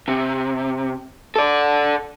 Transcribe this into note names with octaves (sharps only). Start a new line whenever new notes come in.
C3
A4 D5